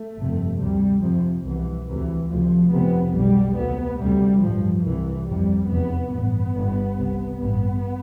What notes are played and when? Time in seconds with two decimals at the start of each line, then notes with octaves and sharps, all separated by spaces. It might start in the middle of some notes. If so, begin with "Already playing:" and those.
Already playing: A3
0.17 G1 F2 C3
0.60 D2 C3 G3
1.03 F1 F2 C3 F3
1.45 C2 B2 E3
1.88 D2 C3 E3
2.30 D2 C3 F3
2.72 F1 F2 C3 B3
3.15 B1 B2 G3
3.57 D2 C3 B3
4.00 D2 C3 G3
4.42 A1 G2 F3
4.85 C2 C3 E3
5.27 G1 F2 C3 G3
5.70 F1 E2 C3 B3
6.13 A1 G2 B3
6.55 G1 G2
6.98 C2 C3
7.40 A1 G2 B3